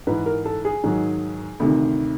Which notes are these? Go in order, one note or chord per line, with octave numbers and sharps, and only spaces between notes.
G#2 E3 B4
A#4
A4
G#4
G#2 D#3 F#3
D2 C3 D#3